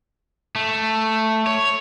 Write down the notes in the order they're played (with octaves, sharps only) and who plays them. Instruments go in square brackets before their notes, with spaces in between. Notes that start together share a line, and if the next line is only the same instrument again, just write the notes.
[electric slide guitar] A3
C#5